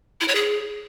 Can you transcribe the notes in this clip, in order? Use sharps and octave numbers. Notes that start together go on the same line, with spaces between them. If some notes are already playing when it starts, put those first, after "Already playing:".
E4
C#5
G#4